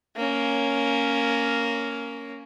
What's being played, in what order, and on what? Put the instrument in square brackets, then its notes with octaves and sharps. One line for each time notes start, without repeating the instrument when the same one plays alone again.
[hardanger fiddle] A#3 C#4